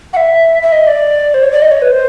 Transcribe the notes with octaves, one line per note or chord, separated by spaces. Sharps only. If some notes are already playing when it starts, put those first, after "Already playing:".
F#5
E5
E5
D#5
D5
C5
C#5
D5
D#5
C#5
B4
C5